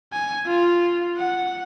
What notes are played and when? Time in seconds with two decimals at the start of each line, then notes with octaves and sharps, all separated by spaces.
0.13 G#5
0.47 F4
1.17 F#5